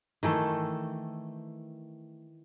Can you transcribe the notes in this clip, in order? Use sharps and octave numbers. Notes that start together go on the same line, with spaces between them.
D#3 E3 A3 A4